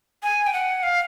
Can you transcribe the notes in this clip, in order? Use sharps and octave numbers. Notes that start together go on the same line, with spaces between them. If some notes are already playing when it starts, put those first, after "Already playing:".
G#5
G5
F#5
F5